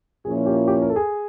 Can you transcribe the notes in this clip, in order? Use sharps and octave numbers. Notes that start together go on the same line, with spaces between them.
A#2 F3 A#3 C#4 E4 G#4
G4
G4
A#4
A4
G#4